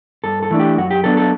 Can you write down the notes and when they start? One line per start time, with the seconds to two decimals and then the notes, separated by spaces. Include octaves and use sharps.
0.24 G2 A4
0.43 A4
0.50 E3 A3 D4
0.60 G4
0.78 F#2 F#4
0.91 G4
1.04 F#3 B3 D4 A4
1.17 A4